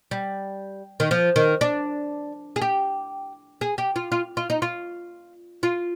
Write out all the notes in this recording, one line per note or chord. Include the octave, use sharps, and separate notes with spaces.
G3
D#3
F3
D#3
D4
G#4
G4
G#4
G4
F4
F4
F4
D#4
F4
F4